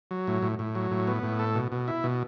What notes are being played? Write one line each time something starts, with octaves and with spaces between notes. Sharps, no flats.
F#3
A2
A2
A2
F#3
A2
B3
A2
A4
B2
B2
E4
B2